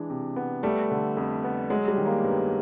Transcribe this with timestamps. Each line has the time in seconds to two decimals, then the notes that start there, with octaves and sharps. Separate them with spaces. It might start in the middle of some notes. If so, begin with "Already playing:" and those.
Already playing: E3 G#3 D4
0.10 C3
0.36 B3
0.63 G3 A3
0.91 D3
1.17 F2
1.44 B3
1.70 F#3 G#3
1.88 G3
1.98 D#3
2.06 A#3
2.24 G2 B3